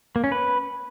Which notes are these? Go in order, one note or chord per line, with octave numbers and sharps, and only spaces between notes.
A#3
C#4
B4